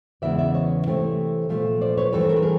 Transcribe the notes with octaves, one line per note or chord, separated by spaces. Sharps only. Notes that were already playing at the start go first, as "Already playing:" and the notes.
E2 C#3 E3 G#3 B3 D5 E5
D5 E5
C#5 D#5
C3 E3 A3 C4
A#2 F3 A3
C5 D5
B4 C#5
G2 E3 A3 C4 A4 B4
A#4
B4
G#4 A#4